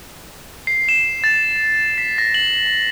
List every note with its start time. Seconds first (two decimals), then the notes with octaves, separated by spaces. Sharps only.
0.67 C7
0.89 E7
1.24 A6
1.98 B6
2.18 A#6
2.34 F#7